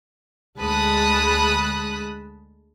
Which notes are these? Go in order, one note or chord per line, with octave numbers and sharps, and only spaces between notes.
D2 G#3 A5 B5 D#6 F#6